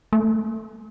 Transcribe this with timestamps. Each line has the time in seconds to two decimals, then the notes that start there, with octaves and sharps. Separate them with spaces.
0.13 A3